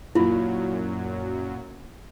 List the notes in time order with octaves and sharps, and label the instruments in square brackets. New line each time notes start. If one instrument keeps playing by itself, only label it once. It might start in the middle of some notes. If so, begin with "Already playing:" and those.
[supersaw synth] F#2 F#3 [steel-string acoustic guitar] A#2 [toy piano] E4 F4